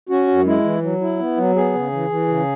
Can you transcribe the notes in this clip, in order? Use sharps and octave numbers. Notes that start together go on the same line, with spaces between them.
C#4 F#4
F#2
G#3 E4
E3
F#3
E4
B3
F#3
B3 G#4
C#3
E3
E3
C#3